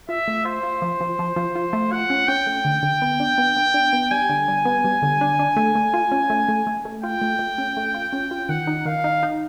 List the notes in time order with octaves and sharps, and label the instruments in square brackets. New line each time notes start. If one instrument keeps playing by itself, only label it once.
[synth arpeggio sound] F4 [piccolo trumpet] E5
[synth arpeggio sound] A3
[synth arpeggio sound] F4 [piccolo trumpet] C5
[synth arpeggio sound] F4
F3
F3
F3
F3
F4
A3
[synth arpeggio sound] F4 [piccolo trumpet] F#5
[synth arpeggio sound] C#4
[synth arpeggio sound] C#4 [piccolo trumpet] G5
[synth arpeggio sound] A3
D3
D3
B3
D4
B3
B3
D4
B3
[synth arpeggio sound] G3 [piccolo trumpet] G#5
[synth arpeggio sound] D3
G3
B3
G3
D3
D4
D4
A3
A3
F4
C#4
A3
A3
A3
A3
[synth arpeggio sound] F4 [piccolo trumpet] G5
[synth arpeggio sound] A3
A3
C#4
A3
F4
C#4
F4
[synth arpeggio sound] D#3 [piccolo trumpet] F#5
[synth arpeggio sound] D#4
[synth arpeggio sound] D#3 [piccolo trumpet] F5
[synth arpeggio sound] D#4
D#4